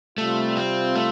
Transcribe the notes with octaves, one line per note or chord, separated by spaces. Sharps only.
C3 G3 A3 F4
C4
A3